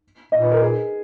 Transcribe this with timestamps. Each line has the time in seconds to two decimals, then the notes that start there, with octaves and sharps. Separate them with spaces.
0.32 A#2 D#5
0.42 B4
0.52 A#4
0.62 G#4